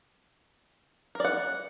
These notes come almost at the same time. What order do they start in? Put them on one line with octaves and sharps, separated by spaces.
A#4 D5 F#5